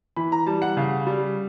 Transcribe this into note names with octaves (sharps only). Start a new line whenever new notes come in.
E3 B5
A#5
G3 A5
F#5
C#3 F5
G3